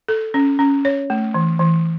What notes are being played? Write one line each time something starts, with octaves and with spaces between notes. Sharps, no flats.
A4
C#4
C#4
C#5
A3
E3
E3